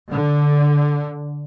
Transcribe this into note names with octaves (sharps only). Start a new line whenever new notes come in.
D3